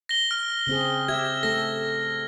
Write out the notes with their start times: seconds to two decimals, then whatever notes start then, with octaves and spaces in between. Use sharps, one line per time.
0.09 A#6 G7
0.31 F6
0.67 C#3 C4 G#4
1.08 G4 E5 G#6
1.43 A3 A4 A#6